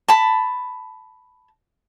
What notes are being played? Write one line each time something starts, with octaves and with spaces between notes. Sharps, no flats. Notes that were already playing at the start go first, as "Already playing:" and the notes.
A5 B5